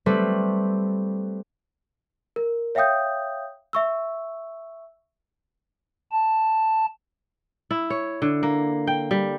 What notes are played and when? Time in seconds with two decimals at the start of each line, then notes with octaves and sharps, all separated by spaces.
0.06 G3 A3 C4 B4
2.36 A#4
2.75 C#5 E5 F5 G5 D#6 G6
3.73 E5 C#6 E6
6.11 A5
7.71 E4
7.90 C#5
8.22 D3
8.43 A#3
8.87 G5
9.11 G3